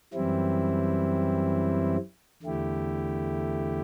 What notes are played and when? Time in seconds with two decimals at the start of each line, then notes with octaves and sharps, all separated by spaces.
0.14 F#2 E3 G3 C4 E4
2.42 E2 D3 A3 E4 G4